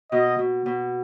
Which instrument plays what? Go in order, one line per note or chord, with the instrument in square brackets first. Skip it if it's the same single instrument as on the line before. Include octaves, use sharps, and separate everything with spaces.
[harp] B2 [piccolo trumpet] D#5
[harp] B2
B2